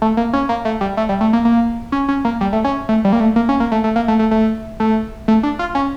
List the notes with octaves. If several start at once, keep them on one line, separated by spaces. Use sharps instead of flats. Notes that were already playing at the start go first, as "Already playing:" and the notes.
A3
A#3
C#4
A#3
A3
G3
A3
G3
A3
A#3
A#3
C#4
C#4
A#3
G3
A3
C#4
A3
G3
A#3
A3
A#3
C#4
A#3
A3
A3
A#3
A3
A3
A3
A3
A3
D4
F4
C#4